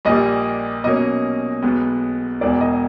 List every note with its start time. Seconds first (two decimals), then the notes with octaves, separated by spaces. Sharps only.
0.05 A#1 A#2 G3 A#3 D#5
0.84 B2 F#3 A#3 C#4 D#5
1.62 B1 B2 G#3 B3
2.41 E1 E2 B2 D5
2.61 D#5